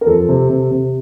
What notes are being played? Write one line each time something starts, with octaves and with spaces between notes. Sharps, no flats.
A#4
F2 A4
C3
C3
C3